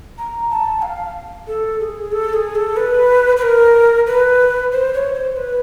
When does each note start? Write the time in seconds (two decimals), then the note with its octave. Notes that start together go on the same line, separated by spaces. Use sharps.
0.18 A#5
0.51 A5
0.82 F5
1.47 A4
1.80 G#4
2.12 A4
2.33 G#4
2.55 A4
2.76 B4
3.37 B4
3.42 A#4
4.06 B4
4.72 C5
4.94 C#5
5.14 C5
5.36 B4